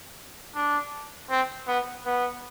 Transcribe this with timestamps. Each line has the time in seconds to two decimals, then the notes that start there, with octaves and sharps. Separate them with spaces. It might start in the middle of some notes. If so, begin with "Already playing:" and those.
0.55 D4
1.30 C4
1.68 B3
2.06 B3